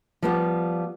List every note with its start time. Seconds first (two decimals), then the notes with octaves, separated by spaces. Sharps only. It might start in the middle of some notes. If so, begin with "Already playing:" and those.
0.22 F3 G3 B3 F4 G4